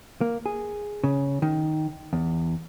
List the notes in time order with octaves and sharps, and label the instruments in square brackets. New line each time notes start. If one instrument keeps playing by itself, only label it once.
[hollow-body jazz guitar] A#3
G#4
C#3
D#3
E2